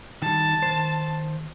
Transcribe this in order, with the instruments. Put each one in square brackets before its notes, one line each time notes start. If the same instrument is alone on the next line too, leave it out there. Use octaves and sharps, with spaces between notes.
[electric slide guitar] D#3 G3 [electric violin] A5
[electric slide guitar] D#3 C5